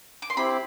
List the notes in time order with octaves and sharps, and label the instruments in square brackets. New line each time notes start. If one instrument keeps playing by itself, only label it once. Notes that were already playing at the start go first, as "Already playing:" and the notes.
[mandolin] D6
C6
[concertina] C4 E4 G4 [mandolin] B5